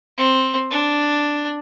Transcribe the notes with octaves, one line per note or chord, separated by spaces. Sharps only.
C4
D4